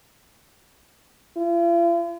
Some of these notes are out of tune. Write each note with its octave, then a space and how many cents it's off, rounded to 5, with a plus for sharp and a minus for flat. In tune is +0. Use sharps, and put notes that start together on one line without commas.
F4 -45